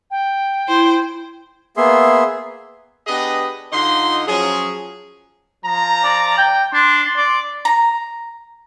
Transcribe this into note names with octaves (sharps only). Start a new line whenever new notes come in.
G5
E4 C5
A#3 B3 G#4 E5 C6
B3 D4 G4 G#4 B4 D#5
D3 D#4 F4 D#5 C6
F3 F#3 C#4 G#4
F3 A#5
D5
G5
D4 C6
D5
A#5